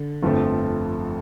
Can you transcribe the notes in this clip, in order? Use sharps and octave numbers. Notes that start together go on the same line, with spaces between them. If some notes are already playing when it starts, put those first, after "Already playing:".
Already playing: D3
G1 F2 F3 A3 C4